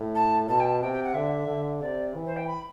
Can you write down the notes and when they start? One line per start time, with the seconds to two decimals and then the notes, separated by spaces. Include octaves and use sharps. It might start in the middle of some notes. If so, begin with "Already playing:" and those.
Already playing: A2
0.15 A5
0.48 B2 A5
0.60 G5
0.65 A5
0.81 C3 G5
0.93 G5
1.04 F#5
1.14 D3 E5
1.48 D3
1.81 C3 D5
2.15 E3
2.26 C5
2.37 G5
2.47 B5